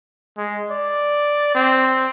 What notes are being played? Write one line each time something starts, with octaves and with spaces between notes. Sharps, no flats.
G#3
D5
C4